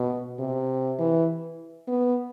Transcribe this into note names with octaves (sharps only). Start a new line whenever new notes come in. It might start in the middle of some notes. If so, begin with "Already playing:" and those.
Already playing: B2
C3
E3
B3